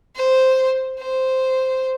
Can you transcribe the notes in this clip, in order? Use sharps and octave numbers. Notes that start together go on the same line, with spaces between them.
C5
C5